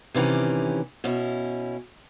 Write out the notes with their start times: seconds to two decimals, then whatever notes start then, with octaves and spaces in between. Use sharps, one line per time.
0.14 C3 D#3 E3 C#4 G4
1.04 B2 C#4 E4